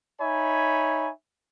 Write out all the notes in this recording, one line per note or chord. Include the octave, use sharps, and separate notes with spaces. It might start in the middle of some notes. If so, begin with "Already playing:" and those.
D#4 C#5 E5 G#5 B5